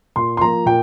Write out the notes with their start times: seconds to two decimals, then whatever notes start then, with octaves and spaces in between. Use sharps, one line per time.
0.16 A#2 C6
0.37 C6
0.41 F3 A#3 A#5
0.66 A#2 G5